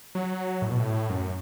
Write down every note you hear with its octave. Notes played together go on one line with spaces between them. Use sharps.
F#3
A2
B2
A2
F#2